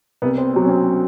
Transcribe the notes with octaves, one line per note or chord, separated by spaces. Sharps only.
C2 B3
C4
B2 F#3
C#4
C4